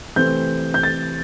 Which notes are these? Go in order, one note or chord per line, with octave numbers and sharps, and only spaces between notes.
C3 E3 A3 C4 G6
G6
A6